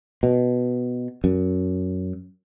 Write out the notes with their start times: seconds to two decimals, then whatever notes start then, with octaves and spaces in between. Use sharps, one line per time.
0.23 B2
1.24 F#2